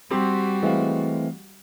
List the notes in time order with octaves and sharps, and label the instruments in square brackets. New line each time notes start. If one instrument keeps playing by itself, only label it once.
[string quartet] G3 F#4 [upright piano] C4 G4 C6
[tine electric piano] E3 A3 C4 [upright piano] G#3 F5